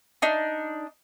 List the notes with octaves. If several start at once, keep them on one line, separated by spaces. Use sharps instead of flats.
D4 D#4